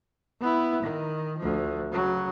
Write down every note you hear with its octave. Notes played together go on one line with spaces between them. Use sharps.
B3 E4
D#3
D2 F3
C#3 F#3